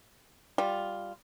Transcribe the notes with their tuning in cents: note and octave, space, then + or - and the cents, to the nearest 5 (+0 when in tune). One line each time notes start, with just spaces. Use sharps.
G3 +0 F4 +0